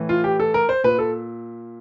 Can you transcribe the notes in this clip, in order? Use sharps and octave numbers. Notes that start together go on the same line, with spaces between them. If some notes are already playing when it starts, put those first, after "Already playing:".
Already playing: A2 E3
F4
G4
A4
A#4
C5
A#2 B4
A4